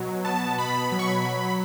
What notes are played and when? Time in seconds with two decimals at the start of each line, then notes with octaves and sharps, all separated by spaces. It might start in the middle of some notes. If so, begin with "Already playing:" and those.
Already playing: B2 F#3
0.25 B3 A5
0.59 B2 B5
0.92 F#3 B5
0.99 C#6
1.07 B5
1.25 F#3